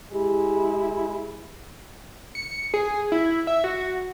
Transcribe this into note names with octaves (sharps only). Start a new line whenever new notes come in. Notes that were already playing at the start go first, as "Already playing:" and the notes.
G#3 E4 G4
C#7
G#4
E4
E5
F#4